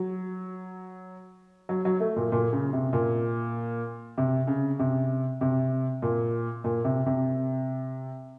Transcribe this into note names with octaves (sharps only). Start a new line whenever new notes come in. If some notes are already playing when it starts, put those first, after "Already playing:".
Already playing: F#3
F#3
F#3
A3
A#2
A#2
C#3
C3
A#2
C3
C#3
C3
C3
A#2
A#2
C3
C3